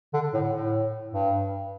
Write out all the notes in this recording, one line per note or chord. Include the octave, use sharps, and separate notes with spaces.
D3
A2
A2
G2